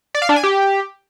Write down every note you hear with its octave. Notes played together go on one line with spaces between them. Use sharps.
D5
F5
D4
G#5
G4